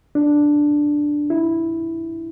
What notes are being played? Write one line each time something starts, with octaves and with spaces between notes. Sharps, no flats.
D4
E4